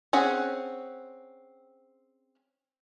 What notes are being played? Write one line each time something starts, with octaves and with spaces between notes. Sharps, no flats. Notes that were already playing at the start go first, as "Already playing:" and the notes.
C4 C#4 G#4 F#5